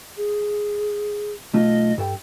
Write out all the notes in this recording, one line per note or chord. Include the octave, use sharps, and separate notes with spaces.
G#4
B1 A3 F4 D#5
G2 A4 G5